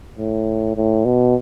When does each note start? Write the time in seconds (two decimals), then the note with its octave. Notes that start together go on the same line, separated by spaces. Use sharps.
0.18 A2
0.76 A2
1.05 B2